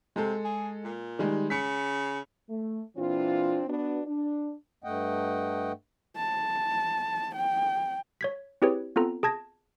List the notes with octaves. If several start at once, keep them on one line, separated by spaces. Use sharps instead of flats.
C3 G#3 A4
G#4
A#2
D#3 G3 G#3
C#3 B6 C#7
A3
A#2 E3 C4 D4 F4
B3 D4 F#4
D4
G2 A3 D#5 F#5 G5
A5
G5
C#5 G#6 B6
C4 E4 G4 G#4 B4 C#5
B3 C4 F4 A4 A#5
G#4 A5 G#6 A#6